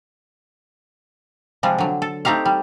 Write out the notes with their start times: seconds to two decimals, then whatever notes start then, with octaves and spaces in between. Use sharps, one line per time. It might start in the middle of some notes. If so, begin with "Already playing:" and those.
1.63 C3 F3 G3 G#3
1.78 D3 F#3
2.02 A4
2.25 A3 C4 D#4 G4 F5
2.45 G3